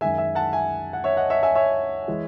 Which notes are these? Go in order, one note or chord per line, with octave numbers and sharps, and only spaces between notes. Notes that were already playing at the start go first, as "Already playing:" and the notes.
F#2 D#3 G#3 E5 G#5
E5 G#5
F#5 A5
E5 G#5
F#5
C#5 E5
D#5 F#5
C#5 E5
E5 G#5
C#5 E5
E3 G#3